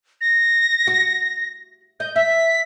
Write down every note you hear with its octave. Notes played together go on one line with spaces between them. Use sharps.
A#6
F#4
D#5 G6
E5 B6